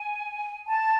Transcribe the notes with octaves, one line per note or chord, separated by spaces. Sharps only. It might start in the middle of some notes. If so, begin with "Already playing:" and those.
Already playing: G#5
A5